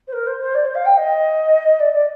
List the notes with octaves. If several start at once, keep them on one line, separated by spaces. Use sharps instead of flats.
C5
A#4
C5
C5
D5
C5
F5
G5
D#5
D5
D5